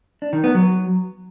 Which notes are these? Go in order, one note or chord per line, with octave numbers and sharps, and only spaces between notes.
D4
D#3
B3
F#3